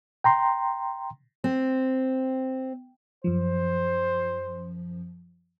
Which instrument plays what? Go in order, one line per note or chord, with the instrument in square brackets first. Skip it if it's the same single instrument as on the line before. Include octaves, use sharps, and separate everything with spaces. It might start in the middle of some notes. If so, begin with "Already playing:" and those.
[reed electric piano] G5 A#5 C6
[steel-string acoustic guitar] C4
[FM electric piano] F#2 F3 [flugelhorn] C5